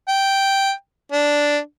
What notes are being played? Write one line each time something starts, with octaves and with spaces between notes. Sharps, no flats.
G5
D4